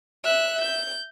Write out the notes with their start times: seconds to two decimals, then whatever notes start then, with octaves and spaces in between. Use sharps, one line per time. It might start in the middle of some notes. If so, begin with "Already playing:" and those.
0.24 E5 F#6
0.61 G6